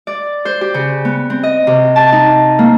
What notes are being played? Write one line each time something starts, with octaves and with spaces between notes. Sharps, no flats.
D5
C5
G4
C#3
B3
C4
D#5
C3
A5
D#4
A#3